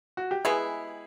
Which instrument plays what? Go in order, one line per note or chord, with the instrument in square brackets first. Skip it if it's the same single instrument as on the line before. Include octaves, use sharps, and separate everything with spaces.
[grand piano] F#4
G4
[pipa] G#3 B3 E4 [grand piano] G#4